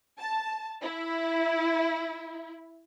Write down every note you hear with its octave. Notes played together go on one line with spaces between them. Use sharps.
A5
E4